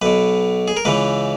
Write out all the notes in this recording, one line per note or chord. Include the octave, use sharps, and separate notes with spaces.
B1 B2 B4
G#4
A#4
C#2 C#3 E3 B4